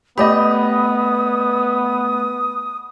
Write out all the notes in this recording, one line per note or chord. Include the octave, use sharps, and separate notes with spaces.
A3 B3 G4 D5 D#5 B5 D#6